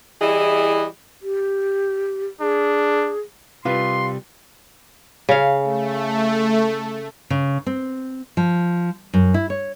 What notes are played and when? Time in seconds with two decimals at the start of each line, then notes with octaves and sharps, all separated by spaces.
0.22 E3 G3 E4 G#4 D#5
1.22 G4
2.40 D4 G#4
3.65 C3 G3 F4 B4 C6
5.29 C#3 F5
5.63 A3
7.30 C#3
7.66 C4
8.37 F3
9.14 F#2
9.34 E4
9.50 C#5